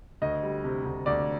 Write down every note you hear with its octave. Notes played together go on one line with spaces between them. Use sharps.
D2 D#5
G3
C3
D2
D2 D5